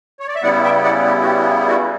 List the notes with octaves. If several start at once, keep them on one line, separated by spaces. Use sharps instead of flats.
C#5
D5
E5
C#3 G3 B3 E4 D5 F#5
E5 G5
D5 F#5
G4
F#4
G4
F#4